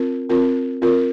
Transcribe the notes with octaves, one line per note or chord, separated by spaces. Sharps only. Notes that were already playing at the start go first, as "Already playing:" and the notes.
Already playing: C4 F4 A#4
C4 F4 A#4
C4 F4 A#4